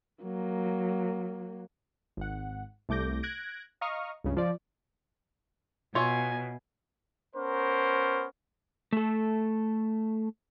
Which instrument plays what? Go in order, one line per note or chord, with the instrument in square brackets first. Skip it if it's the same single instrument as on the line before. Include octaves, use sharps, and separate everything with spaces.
[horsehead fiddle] F#3 A#3
[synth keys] G#1 F#5
C2 A3 D6 G6 A#6
F#6 G#6 A#6 D7
D#5 F5 A#5 C#6 D#6 F6
C#2 G2 C#3
F3 D5
[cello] B2 [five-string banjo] F4 C#5 E5 [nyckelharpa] G#5
[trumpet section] B3 C#4 A#4 C5
[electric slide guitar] A3 A4